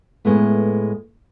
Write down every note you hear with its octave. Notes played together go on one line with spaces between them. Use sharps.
A2 G#3 A3 B3